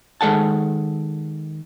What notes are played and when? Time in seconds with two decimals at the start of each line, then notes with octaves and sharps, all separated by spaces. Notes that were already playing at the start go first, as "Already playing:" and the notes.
0.21 D#3 G#3 A4 F#5 A5